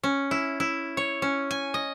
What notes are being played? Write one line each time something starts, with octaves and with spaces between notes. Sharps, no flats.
C#4
E4
E4
C#5
C#4
G#5
D#5